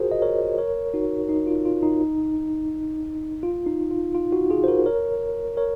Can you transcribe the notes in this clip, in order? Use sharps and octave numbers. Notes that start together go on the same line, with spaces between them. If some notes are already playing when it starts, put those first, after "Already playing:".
Already playing: F4 F#4 G#4 A#4 C5
D#5
A#4 C#5
A#4 C#5
D#4 F#4
D#4
F4
F4
D#4
F4
D#4
F4
F4
D#4 F#4
F4 G#4
C5
F#4 A#4
A#4 C#5
A#4 C#5